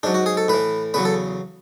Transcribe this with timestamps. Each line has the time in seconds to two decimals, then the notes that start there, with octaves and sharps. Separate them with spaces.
0.03 G#2 F#3 D4
0.14 F#4
0.26 G#4
0.37 A4
0.48 A2 E3 B4
0.94 E2 C#3 F#3 B4
1.05 A4